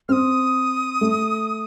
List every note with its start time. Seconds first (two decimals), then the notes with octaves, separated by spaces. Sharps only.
0.09 C4 D#6 F6
1.01 A3